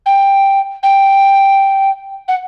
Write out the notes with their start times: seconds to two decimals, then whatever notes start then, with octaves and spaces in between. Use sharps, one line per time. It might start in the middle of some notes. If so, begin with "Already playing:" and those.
0.06 G5
0.83 G5
2.28 F#5